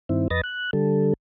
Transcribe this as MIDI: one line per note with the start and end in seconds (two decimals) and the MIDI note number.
0.09 0.28 43
0.09 0.28 51
0.09 0.28 60
0.09 0.28 64
0.30 0.41 41
0.30 0.41 71
0.30 0.41 75
0.30 0.41 93
0.30 0.41 94
0.44 0.71 90
0.73 1.14 50
0.73 1.14 55
0.73 1.14 69